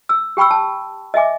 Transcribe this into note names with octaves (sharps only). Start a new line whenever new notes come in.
E6
G4 G5 B5 C#6 E6
A5
D#5 E5 G#5 D6